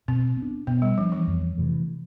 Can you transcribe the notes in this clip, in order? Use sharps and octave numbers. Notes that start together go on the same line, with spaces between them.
B2 C4
B3
D4
B2 B3
G3
F3 B3 D4
E3
F2
C3 E3 A3